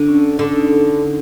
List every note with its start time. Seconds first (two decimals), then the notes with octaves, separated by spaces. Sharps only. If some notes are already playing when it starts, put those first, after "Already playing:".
Already playing: D3 D4
0.09 C#4
0.24 C#4
0.39 D3 D4
0.53 D#4